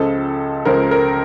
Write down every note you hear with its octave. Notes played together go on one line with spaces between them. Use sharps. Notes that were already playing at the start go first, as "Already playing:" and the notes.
Already playing: C#2 C#3 F3 A4
C#2 C#3 F3 A#4
A#4